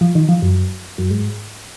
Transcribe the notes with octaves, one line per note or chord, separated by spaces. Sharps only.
F3
D#3
F3
F#2
F#2
G#2